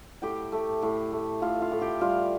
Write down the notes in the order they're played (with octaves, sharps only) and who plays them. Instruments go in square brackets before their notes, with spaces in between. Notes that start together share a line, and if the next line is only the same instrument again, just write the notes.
[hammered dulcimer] A2 G4 G5
A3
A2
A3
A2 F4 F5
F4 F5
A2
G4 G5
G3 F4 F5